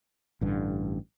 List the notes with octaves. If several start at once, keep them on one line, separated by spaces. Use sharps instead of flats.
A1 G2 D3